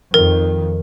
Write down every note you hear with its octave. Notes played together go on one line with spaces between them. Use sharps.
F2 D#3 A#4